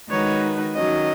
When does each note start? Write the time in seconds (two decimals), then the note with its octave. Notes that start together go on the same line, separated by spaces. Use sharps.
0.10 D#3 G#3 D#4 F#4 B4 C#5
0.75 D#3 F#3 C#4 D#5